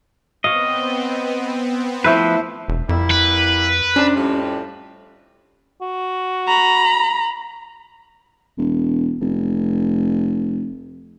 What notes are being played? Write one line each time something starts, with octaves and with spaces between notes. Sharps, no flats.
B3 C4 C#5 D#5 F5
F3 A3 E4 B4 C5
E1
F2 G3 A#3 E4
B4
C3 C#4 D4
F2 A2 G3
F#4
A#5 B5
E1
F1